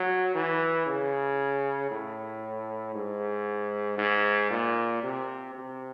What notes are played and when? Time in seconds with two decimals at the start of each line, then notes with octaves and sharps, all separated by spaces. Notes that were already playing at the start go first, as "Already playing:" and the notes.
Already playing: F#3
0.35 E3
0.86 C#3
1.91 A2
2.94 G#2
3.98 G#2
4.50 A#2
5.03 C3
5.54 C3